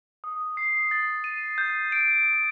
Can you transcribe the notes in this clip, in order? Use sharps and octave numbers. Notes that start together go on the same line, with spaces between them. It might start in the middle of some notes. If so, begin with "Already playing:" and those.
D#6
C7
A6
D#7
G6
D7